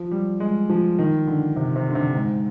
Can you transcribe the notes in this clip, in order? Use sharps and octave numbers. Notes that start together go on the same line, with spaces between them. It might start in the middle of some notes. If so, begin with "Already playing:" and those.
Already playing: F3
G3
G#3
F3
D#3
D3
C3
C3
D3
C3
G#2